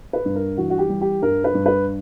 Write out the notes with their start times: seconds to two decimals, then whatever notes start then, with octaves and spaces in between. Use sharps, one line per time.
0.13 B4
0.25 G2
0.35 A#4
0.57 E3 F#4
0.70 F#4
0.78 G4
0.89 G3
1.01 G4
1.22 G2 A#4
1.44 B4
1.54 G2
1.66 B4